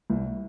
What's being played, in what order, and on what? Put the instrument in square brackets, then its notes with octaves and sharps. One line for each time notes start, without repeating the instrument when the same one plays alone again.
[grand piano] C2